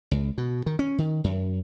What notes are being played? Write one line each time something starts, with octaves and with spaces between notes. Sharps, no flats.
C#2
B2
D#3
C#4
D#3
F#2